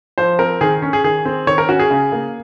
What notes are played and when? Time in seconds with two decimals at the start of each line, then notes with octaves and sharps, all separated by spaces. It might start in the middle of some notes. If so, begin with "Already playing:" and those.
0.18 F3 C5
0.39 C4 A#4
0.61 D#3 G#4
0.82 C#4
0.93 G#4
1.04 D#3 G#4
1.25 C4
1.47 D#3 C#5
1.58 A#4
1.69 C#4 F#4
1.79 G#4
1.91 C#3
2.12 A#3